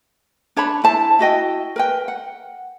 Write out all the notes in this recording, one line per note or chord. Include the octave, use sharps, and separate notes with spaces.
D4 C#5 A5 B5
E4 C5 A5
E4 F#4 D#5 G5
A#4 B4 G5
F#5